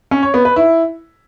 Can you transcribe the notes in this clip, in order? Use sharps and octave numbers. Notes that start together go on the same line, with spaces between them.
C#4
C#5
B3
B4
E4